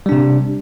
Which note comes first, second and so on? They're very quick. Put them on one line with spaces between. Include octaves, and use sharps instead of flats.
G3 D4 C3